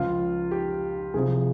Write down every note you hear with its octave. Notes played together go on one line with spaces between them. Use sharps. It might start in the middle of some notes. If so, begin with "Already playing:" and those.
Already playing: C#2 C#3 F3 F4
G4
C2 C3 F3 G#4